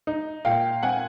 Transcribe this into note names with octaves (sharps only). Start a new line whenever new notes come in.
D#4
A#2 F5 G5
C4 F#5 G#5